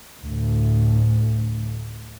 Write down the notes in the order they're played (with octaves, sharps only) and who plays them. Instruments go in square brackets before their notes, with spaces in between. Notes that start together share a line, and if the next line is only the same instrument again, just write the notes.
[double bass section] D2 A2